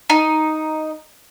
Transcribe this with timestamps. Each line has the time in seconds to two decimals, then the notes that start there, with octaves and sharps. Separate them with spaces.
0.10 D#4